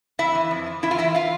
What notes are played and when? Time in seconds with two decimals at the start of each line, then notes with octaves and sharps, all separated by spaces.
0.19 F2 E4 E5
0.35 E3
0.51 F2
0.66 E3
0.82 F2 E4 E5
0.91 F4 F5
0.98 E3 E4 E5
1.15 F4 F5